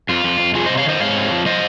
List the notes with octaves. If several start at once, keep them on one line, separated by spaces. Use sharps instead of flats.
F2 F4
F2
F2
F2 F4 G#4
C3 C5 D#5
C#5 F5
D#3 C5 D#5
G#2 C#5 F5
C4
F3
F3 C5 D#5